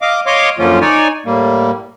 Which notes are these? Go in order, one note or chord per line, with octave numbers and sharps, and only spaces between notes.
D#5 F5 D6
C#5 D#5 F5 C6 D6
F#2 D3 F3 A#3 C#4 F4
D#4 C#5 D5 G#5
A2 G3 A#3